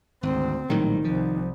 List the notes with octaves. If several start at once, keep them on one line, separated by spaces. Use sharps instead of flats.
G#1 D2 C4
A#1 A2 D#3 F#3 G3
C2 F3